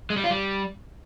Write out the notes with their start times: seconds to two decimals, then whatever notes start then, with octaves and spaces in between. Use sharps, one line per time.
0.10 G#3
0.17 G3
0.24 F4
0.31 G3